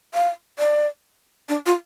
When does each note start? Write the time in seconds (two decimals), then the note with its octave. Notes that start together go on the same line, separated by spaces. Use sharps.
0.14 F5
0.59 D5
1.49 D4
1.66 F4